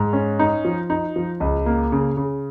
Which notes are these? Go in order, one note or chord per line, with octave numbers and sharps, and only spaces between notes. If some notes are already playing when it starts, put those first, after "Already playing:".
Already playing: G#2
C#4
D#4
F3
D#4
F3
C#2
A#3
C#3
C#3